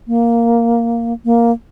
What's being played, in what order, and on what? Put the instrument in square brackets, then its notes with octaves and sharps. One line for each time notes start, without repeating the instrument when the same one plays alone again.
[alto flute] A#3
A#3